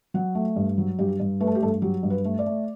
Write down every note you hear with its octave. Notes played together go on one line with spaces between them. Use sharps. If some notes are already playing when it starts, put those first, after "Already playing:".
F#3 F#5
A3
G2
F#3
G2 G4
G2
A3 B4
A4
G4
G2 A4
F#3 G4
G2
B4
A3
D5
A3